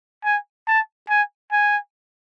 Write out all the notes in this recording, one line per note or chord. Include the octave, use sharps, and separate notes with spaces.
G#5
A5
G#5
G#5